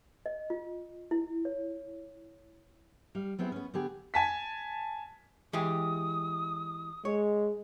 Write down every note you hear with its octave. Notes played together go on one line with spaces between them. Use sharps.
D#5
F4
E4
C#5
G3 F5
F#3 B3 C4 E4 G#4
B3 C#4
D3 B3 G4 G#4
G#5 A5 B6
E3 G#3 G4 D#6
G#3 C#5